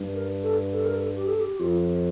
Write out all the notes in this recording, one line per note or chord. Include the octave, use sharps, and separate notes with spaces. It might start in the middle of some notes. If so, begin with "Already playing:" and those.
Already playing: G2
A#4
A4
A4
A#4
A4
G4
A4
G4
G4
F2 F4